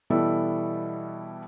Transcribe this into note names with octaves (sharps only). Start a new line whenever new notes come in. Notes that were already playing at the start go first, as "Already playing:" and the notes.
B2 E3 G3 E4 A4